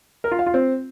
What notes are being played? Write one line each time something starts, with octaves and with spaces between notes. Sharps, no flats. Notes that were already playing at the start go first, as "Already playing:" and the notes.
A#4
F4
F5
F4
C4